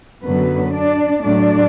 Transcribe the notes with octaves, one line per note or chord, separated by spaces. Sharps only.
F#2 D3 F#3 B3 B4
D4 D5
A2 F#3 A3 D4 D5